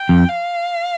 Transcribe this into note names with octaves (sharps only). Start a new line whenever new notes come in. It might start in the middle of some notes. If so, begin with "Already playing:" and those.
Already playing: G5
F2
F5